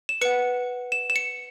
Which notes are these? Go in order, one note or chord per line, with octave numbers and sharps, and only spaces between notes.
E7
B4 F#5 C#7
E7
E7
C#7